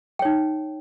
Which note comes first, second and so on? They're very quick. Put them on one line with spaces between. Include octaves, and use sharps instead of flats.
G5 C#5 D#4